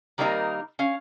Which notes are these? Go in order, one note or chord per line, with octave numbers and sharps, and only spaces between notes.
D#3 G3 A#3 C4 D#4 A#4
C#4 F5